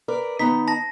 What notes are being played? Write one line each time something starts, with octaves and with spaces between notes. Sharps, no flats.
A#4 B4 D5
D#3 B3 D#4 B6
A5 A#6